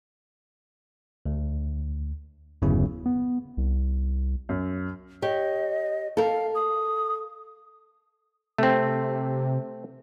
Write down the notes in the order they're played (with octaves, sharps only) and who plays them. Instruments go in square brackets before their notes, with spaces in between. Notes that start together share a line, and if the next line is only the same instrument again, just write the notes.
[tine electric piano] D2
G1 E2 C#3 F#3 B3 E4
[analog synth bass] B3
C2
[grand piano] F#2
[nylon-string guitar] G4 C#5 [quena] D#5
[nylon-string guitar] A4 A#4 [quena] F5
[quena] D#6
[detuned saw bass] C3 [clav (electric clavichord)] A3 C4